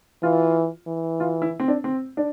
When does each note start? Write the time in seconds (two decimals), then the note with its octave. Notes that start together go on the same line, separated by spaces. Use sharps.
0.23 E3 F4
0.87 E3
1.20 F4
1.42 E4
1.60 C4
1.68 D4
1.84 C4
2.17 D4